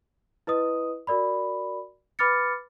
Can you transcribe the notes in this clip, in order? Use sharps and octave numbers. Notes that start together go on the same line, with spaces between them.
E4 B4 D#5 D#6
F#4 A#4 D5 B5
B4 B5 D6 F6 A6 C#7